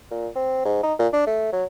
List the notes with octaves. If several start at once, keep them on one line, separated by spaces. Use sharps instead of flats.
A#2
C4
G#2
D#4
A#2
D4
A3
F#3